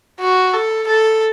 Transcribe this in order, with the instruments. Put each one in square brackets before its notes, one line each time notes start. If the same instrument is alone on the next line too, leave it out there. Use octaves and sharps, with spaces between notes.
[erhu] F#4
A4
A4